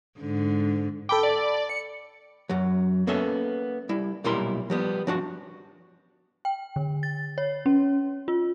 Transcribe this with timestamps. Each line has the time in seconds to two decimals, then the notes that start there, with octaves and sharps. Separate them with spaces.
0.20 G#2 D3
1.09 A4 G5 B5 D6
1.23 D5
1.69 C#7
2.49 F#2 F#3
3.07 A#3 B3 C#4 A4 E5
3.89 G3 E4
4.24 B1 A#2 G3 E4 A#4 C6
4.70 F3 G3 B3
5.07 F3 D4 F#4
6.45 G5
6.76 D3
7.03 A6
7.38 C#5
7.66 C#4
8.28 F4